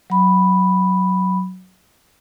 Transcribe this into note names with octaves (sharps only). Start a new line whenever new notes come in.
F#3 B5